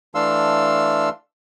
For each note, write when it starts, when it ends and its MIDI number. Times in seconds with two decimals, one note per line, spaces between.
0.15 1.09 52
0.15 1.09 57
0.15 1.09 62
0.15 1.09 77
0.15 1.09 84
0.15 1.09 88